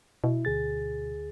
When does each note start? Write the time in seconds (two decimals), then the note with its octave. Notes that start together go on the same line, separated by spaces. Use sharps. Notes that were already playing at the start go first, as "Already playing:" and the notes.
0.24 B2 E4
0.45 D2 G#4 A6